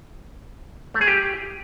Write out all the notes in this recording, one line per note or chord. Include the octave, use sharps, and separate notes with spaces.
A3
G#4
G4